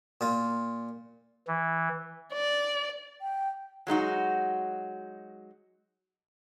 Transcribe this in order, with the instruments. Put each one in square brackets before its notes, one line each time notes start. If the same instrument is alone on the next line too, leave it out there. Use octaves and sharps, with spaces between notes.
[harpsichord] A#2 F4
[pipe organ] E3
[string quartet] D5
[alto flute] G5
[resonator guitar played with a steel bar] F#3 G#3 D#4 F#4